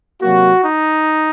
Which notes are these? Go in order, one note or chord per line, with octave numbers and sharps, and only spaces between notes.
C3 F#3 A#3 F#4
D#4